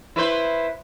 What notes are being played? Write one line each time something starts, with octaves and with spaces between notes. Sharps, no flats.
E4 B4 C5